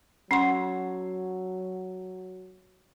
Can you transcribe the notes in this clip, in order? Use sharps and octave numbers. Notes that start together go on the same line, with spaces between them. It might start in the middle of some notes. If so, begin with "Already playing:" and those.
F#3 C#4 F#4 A4 C#5 C6